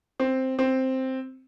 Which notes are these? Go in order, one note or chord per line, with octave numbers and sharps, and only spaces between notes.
C4
C4